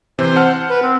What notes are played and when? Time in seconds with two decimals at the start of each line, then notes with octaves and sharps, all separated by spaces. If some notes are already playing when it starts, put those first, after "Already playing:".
0.19 C3 E3 C4 C5
0.36 F#5 A5 F6
0.69 B4
0.82 C4